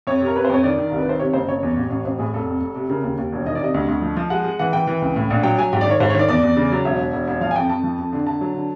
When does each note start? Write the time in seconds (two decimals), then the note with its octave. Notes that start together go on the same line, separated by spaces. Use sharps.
0.07 F2 C#5
0.21 C3
0.26 A#4
0.35 C3 B4
0.45 C5
0.49 F2 C#5
0.63 D#3 D5
0.78 D#3
0.87 C2 A#4
0.99 B4
1.06 D#3 C5
1.19 C3 C#5
1.34 F#1 C5
1.48 F#1 C#5
1.63 E2
1.77 A1
1.90 A1
2.05 A1 C5
2.18 A2 G#4
2.34 F1 A4
2.47 F2
2.61 F1
2.75 C3
2.90 C#3 A#4
3.03 D#2
3.18 D#2
3.33 E1
3.45 D#3 D#5
3.55 D5
3.61 C3 D#5
3.74 D2
3.88 D2
4.02 F3
4.17 F3
4.30 G#3 F#5
4.44 G#3
4.59 E3 F#5
4.73 E3 G5
4.87 E3
5.02 C#2
5.16 A2
5.30 A#1
5.43 F#3 G5
5.58 F#3 G#5
5.73 G#2 G5
5.81 D5
5.86 D#3 C#5
6.00 G#2 C5
6.10 C#5
6.15 D#3 D5
6.28 E2 D5
6.43 E2
6.57 C#3
6.72 F#3
6.85 E1 E5
6.99 E1
7.13 E1
7.28 E1
7.41 F3 F5
7.51 G#5
7.56 F2 G5
7.69 F2 A5
7.84 F3
7.98 F2
8.13 D3
8.27 D3 A5
8.41 F#3
8.54 D3